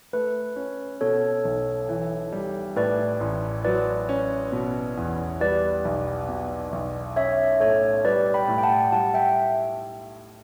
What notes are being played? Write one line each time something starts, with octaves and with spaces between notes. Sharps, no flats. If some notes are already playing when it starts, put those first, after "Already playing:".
A3 B4
C#4
B2 A4 C#5
B1
E3
G3
A2 B4 D5
A1
F#3 B4 D5
C#4
B2
E2
G3 B4 D5
B1
B2
B1
C#4 C#5 E5
A2 A4 C#5
G3 B4 D5
G5 B5
A2
G5
F#5 A5
G3 F#5 A5
E5 G5